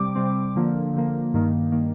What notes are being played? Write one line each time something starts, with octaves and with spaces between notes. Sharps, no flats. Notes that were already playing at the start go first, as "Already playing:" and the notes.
Already playing: C3 G3 C4 D6
C3 G3 C4
D3 F3 A#3
D3 F3 A#3
G2 D#3 A#3
D#3 A#3